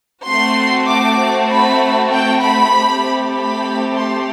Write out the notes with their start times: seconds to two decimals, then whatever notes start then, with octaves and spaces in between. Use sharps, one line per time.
0.25 A3 C4 F#4 C6
0.87 D6
1.48 B5
2.11 G5
2.41 B5
2.73 A3 C4 G4
3.34 B5
3.96 C6